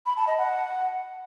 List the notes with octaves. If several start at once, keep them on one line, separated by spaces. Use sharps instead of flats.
B5
A5
D#5
F#5